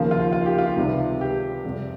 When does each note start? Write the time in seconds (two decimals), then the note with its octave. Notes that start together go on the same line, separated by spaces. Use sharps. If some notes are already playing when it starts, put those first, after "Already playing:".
Already playing: D#2 C#3 F3 A#3
0.11 F4
0.33 F4
0.46 G4
0.58 F4
0.77 C#2 C3 D#3 G3
1.21 G4
1.65 F2 C3 G3